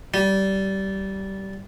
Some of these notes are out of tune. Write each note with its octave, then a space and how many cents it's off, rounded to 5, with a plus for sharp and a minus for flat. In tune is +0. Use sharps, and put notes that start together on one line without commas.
G3 -20